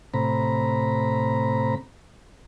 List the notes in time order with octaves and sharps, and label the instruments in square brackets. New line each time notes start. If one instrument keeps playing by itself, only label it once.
[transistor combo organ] A2 C3 C4 A#5 B5